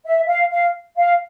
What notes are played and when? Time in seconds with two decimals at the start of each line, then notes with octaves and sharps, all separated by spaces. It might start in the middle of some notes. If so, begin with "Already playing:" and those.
0.05 E5
0.27 F5
0.51 F5
0.97 F5